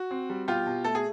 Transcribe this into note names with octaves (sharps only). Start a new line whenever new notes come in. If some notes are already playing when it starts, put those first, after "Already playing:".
Already playing: F#4
C4
G3
B2 F4 G4
B2
A3 A4
G#4